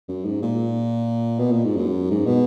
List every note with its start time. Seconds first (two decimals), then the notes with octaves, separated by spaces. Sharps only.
0.08 F#2
0.25 G#2
0.42 A#2
1.39 B2
1.52 A#2
1.64 G#2
1.76 F#2
2.11 G#2
2.27 B2